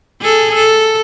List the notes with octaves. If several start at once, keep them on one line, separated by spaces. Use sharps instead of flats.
G#4 A4
A4